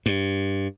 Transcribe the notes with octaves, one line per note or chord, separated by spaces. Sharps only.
G2